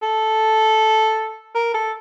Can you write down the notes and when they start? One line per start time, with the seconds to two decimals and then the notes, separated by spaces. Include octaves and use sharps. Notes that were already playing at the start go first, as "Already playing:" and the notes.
0.02 A4
1.55 A#4
1.74 A4